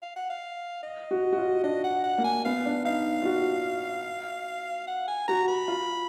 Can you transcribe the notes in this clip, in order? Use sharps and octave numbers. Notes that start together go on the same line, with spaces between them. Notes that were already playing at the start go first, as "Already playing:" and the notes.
F5
F#5
F5
D#5
F#4
F#4
F4
D4 D#5
F#5
F#5
A#3
G#5
B3 F5
D4
D#4 F5
F4
F#4
F#5
G#5
F#4 A#5
B5
F4